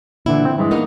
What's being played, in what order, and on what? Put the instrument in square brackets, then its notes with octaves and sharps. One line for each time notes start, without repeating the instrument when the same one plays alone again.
[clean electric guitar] A#2 D3 E3 [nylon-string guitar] E4
[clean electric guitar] C4
G2 E3 G#3
[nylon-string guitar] A#3 B3 D#4